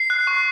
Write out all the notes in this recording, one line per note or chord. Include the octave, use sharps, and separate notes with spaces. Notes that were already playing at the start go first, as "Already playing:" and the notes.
Already playing: C7
F#6
C#6